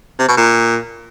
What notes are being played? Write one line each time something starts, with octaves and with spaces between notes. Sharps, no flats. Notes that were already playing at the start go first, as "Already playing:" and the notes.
C3
B2
A#2